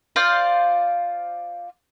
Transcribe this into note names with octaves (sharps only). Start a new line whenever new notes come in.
F4 C5 D5 F5